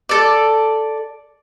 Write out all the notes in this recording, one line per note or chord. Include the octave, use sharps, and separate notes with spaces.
A4 D5